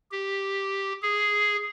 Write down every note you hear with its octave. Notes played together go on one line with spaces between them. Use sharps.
G4
G#4